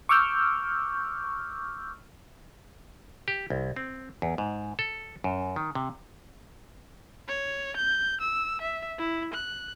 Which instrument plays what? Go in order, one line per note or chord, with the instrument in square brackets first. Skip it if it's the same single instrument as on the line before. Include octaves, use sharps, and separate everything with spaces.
[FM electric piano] C#6 D6 E6 F6 G6
[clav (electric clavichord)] G4
C2
C4
E2
G#2
A4
F#2
D#3
C3
[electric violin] C#5
G6
E6
E5
E4
F#6